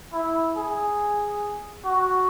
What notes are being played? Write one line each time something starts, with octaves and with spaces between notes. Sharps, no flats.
E4
G#4
F#4